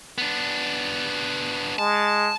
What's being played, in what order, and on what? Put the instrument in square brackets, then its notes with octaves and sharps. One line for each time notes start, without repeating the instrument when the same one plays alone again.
[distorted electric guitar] B3 D4
[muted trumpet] G#3 [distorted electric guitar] A5